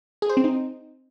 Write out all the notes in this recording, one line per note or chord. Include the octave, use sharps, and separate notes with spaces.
G#4
C5
C4
D#4